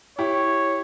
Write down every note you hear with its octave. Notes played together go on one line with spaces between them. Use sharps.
E4 G4 C#5